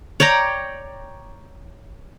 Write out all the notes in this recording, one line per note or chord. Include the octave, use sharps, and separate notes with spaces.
C#5 D5 G5 A#5